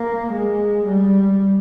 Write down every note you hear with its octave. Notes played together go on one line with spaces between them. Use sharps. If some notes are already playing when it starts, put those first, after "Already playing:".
Already playing: A#3
G#3
G3